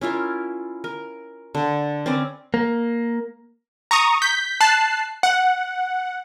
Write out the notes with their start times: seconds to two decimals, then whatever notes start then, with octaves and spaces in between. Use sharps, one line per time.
0.01 C#4 E4 F4 A#4
0.84 A#4
1.55 D3
2.06 C4 C#4 B4 D5
2.54 A#3
3.91 A#5 C#6 D#6
4.22 G6 B6
4.61 A5 F#6 C7
5.23 F#5